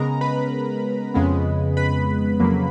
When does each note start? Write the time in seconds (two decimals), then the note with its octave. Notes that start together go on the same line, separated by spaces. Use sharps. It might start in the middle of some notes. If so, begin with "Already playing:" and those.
Already playing: C#3 G#3 B3 A#4 A#5
0.21 B4 B5
1.14 F2 C#3 G#3 B3
1.77 B4 B5
2.40 F2 C#3 F#3 A#3